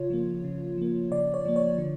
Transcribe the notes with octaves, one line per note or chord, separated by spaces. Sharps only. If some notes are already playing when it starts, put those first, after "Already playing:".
Already playing: C#3 F4 C#5
F3 A#3
C#3
F3 A#3
C#3 D5
C#5
F3 A#3
C#5
D3